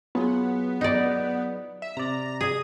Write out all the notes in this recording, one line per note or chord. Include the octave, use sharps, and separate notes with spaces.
F#3 B3 F4 G#4
D#4 D5
E5
C3 D5 A#5
G#4 D#6